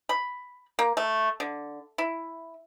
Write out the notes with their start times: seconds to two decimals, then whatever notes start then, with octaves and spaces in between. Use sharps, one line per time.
0.09 B5
0.79 A#3
0.97 A3
1.40 D3
1.98 E4